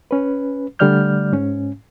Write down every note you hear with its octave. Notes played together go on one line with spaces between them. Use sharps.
C#4 B4
D3 G3 A3 D5 F6 G6
G#2 C#4